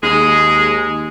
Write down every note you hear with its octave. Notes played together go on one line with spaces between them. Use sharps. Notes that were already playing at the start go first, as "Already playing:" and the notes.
D#2 G#3 G#4